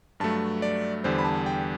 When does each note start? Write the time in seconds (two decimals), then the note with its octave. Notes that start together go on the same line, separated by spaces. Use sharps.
0.20 G2 F#3 A3 A5
0.62 D5
1.04 E2 D3 G3 C5
1.18 B5
1.25 A5
1.46 G5